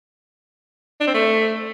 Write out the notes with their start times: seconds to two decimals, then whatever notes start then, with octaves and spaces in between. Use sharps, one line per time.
1.01 D4
1.07 C4
1.14 A3